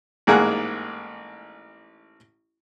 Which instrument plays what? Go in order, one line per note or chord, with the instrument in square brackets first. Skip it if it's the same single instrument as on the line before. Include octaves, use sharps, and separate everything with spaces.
[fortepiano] A1 G#2 A#3 D#4 G#4 F#5